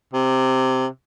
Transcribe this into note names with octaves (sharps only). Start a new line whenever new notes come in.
C3